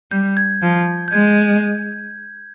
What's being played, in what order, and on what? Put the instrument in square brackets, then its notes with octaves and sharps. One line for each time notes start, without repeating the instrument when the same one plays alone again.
[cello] G3 [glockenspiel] G6
[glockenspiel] G#6
[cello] F3
[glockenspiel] G6
[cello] G#3 [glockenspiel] G#6